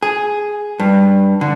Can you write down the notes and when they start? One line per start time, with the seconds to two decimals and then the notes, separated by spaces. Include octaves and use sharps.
0.03 G#4
0.80 G2
1.41 D3